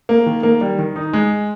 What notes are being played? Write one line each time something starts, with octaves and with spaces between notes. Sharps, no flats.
A#3
D#3
A#3
G3
D#3
D#4
G#3